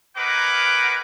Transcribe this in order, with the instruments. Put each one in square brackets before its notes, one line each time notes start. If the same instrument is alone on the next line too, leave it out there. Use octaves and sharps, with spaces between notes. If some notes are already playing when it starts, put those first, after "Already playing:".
[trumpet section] D#4 G#4 A#4 B4 F#5 D6